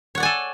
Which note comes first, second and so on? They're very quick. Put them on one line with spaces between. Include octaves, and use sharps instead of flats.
C#5 F#5 D5 G#5 A4